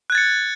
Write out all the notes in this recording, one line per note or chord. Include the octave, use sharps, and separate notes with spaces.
F#6 G#6 A6 C#7